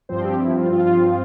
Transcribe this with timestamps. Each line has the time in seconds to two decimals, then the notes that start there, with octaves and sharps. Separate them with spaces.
0.09 G2 F3 C4 C5
0.24 G4
0.40 E4
0.56 F4
0.72 F4